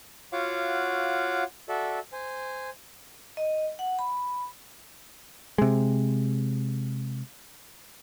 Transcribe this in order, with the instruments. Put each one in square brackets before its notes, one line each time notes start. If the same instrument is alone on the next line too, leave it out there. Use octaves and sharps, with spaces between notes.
[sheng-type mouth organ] F4 F#4 C#5 F5 F#5 D6
F#4 A4 D5 E5
C5 G#5
[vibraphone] D#5
F#5
B5
[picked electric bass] C3 G#3